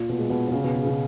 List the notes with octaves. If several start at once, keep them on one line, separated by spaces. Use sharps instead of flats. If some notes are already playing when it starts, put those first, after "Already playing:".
Already playing: A#2
B2
G#3
B2
B2
C#3
B2
B2
C#3
B2